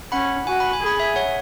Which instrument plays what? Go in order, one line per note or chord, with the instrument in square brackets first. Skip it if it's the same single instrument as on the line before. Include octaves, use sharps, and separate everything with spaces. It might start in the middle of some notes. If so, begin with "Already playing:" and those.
[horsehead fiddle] C#4 [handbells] F#5 B5
[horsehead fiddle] F#4 [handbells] G#5
[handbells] B5
G#5
[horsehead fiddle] G#4 [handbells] B5
[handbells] E5 G#5
C#5 F#5